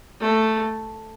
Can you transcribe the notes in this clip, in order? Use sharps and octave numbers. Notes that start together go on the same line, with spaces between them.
A3